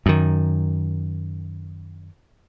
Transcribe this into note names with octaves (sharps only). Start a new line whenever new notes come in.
F#2 D#3